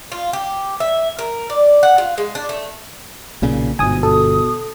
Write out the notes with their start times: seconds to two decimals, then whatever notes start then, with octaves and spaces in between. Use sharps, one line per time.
0.12 F4
0.33 G4
0.80 E5
1.19 A#4
1.50 D5
1.83 F#5
1.98 F4
2.18 G#3
2.35 D4
2.49 A3
3.42 B1 A#2 C#3
3.79 G1 G#2 B2 G#5 D#6
4.03 B2 A4 D#6